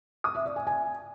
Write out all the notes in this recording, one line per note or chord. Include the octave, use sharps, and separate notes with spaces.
D#6
E5
D5
G#5
G#5